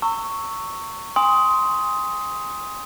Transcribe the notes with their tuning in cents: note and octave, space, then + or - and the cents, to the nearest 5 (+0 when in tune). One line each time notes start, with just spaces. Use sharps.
A#5 -40 C#6 +0 E6 +0
G#5 -35 C6 +0 D#6 +20